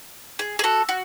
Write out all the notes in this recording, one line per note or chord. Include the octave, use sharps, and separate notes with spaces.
G#4
G#4
F#4 A4
F#4